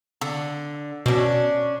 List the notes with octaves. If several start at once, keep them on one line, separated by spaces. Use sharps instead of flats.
D3
B2 C#4 D4